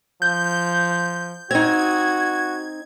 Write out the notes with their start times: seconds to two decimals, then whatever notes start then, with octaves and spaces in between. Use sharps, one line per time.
0.22 F3 G6
1.51 C4 D#4 F#4 G#6